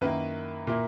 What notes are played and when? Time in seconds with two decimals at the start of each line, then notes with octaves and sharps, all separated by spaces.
0.01 F#2 D#3 A#3 E4 B4
0.67 A#2 A#3 E4